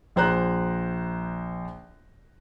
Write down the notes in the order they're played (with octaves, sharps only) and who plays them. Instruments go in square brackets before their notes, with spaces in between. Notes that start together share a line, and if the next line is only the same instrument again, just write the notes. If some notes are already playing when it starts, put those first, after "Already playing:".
[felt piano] A#1 C5 A#5 F#6